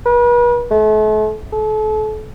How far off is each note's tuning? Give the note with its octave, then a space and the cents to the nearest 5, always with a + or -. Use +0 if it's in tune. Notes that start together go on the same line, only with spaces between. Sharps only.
B4 -40
A3 -40
A4 -35